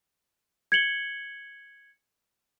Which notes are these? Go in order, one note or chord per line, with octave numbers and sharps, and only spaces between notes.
G#6 C#7 F#7 G7